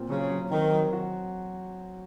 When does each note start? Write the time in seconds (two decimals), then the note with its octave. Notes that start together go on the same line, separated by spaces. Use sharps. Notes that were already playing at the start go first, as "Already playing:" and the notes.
Already playing: A#2 C4 F4
0.10 C#3 F#3
0.31 F#3
0.52 D#3 C4
0.72 F#3
0.93 F#4